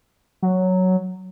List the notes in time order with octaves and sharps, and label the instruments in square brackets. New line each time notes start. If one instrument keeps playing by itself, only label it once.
[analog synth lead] F#3